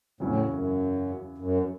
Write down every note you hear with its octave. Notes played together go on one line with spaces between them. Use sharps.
E2 A2 C#3 F#3 C#4
F#2
F#2